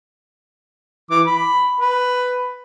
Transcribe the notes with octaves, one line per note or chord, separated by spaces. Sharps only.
E3 D6
B5
B4